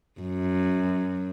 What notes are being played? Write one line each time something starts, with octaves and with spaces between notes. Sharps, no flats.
F#2